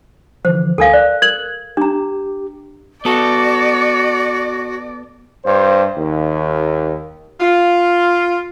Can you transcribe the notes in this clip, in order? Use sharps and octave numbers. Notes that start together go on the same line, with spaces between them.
D3 E3 F3 C5
D2 A4 A#4 F5 G#5
D5 F#6
A#4 G#6 F#7
D4 G4 A#5
B3 F#4 A4 D5
G2 C5
D#2
F4